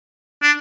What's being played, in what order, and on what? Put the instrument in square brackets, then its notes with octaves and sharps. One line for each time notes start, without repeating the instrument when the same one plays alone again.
[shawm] D4